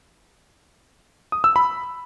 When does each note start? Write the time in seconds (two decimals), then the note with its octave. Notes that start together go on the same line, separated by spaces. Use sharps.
1.32 D#6
1.44 E6
1.56 B5